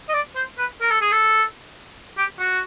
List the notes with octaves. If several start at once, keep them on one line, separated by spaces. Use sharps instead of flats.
D#5
D5
C5
B4
A#4
A4
G#4
A4
G4
F#4